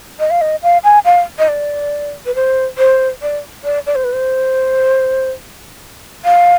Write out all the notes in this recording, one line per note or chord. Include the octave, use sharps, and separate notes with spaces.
D#5
F5
D#5
F5
G#5
F5
D#5
D5
B4
C5
C5
D5
D5
D5
C5
B4
C5
F5